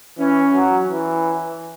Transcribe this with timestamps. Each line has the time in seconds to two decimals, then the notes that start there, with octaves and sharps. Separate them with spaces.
0.18 E3 C#4
0.53 F#3
0.87 E3